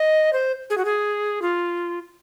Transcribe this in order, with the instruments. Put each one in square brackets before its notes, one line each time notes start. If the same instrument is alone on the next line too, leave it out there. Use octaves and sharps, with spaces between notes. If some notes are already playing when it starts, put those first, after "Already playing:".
Already playing: [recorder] D#5
C5
G#4
F#4
G#4
F4